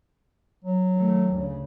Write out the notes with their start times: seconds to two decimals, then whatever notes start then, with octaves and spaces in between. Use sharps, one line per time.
0.64 F#3
0.95 D#3 A3
1.33 D2 C#3